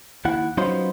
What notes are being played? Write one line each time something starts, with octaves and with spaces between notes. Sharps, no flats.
D#2 E4 F#5
F#3 B3 C#4 D#4 F4 C5